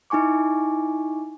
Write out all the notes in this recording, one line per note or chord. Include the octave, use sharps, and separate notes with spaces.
D#4 E4 G#5 C#6 D6